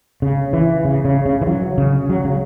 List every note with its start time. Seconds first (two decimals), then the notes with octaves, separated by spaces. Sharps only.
0.22 C#3
0.53 E3
0.85 C#3
1.05 C#3
1.26 C#3
1.41 E3
1.47 F#3
1.78 C#3
2.10 F#3
2.25 C#3